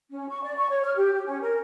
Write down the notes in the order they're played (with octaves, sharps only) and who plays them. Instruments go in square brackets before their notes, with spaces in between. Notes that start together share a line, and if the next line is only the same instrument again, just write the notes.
[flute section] C#4
C#6
D5
C#6
C#5
F6
G4
G4
C#4
A#4